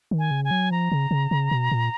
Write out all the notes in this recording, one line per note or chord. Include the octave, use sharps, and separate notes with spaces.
D#3
G#5
C#3
G#5
F#3
F3 A#5
C#3
C#3
C#3
B2
A#2